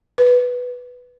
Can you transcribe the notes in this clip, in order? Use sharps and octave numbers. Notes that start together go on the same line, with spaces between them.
B4